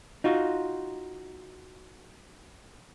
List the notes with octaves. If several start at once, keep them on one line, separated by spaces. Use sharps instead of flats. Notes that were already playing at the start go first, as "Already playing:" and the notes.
D#4 F4 F#4